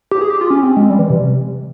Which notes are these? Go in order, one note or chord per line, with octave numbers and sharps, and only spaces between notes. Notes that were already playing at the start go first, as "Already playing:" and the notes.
G4
G#4
G4
F4
C#4
C4
G#3
G3
E3
C3